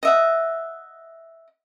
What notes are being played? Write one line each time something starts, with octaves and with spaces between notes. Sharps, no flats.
D#5 E5 F#5